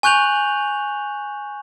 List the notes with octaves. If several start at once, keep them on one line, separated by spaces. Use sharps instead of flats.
G#5 C#6 F#6 G6 F7 F#7